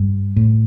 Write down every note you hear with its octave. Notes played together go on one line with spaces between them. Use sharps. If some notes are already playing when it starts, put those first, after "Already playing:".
Already playing: G2
A2